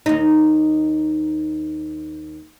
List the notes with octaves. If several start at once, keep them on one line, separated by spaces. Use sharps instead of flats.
D#2 D#4